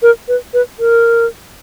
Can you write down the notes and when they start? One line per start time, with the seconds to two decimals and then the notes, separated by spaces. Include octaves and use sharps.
0.02 A#4
0.28 B4
0.54 B4
0.80 A#4